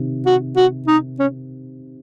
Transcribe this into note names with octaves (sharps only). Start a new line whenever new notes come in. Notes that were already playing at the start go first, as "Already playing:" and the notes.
Already playing: C3 D#3
F#4
F#4
D#4
C#4